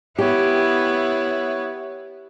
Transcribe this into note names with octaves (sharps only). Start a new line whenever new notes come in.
B3 E4 G4 C#5